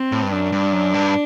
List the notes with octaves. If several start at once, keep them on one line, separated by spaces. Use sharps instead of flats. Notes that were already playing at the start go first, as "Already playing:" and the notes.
Already playing: C4
A2
G2
F#2 D4
G2
F#2
G2